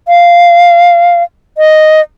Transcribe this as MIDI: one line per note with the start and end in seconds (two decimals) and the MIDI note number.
0.08 1.23 77
1.58 2.01 75